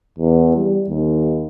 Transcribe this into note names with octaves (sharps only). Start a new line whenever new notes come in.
E2
G3
D#2